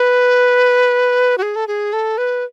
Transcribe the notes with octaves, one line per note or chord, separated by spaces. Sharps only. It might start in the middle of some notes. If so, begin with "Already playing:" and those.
Already playing: B4
F#4
G#4
A4
G#4
A4
B4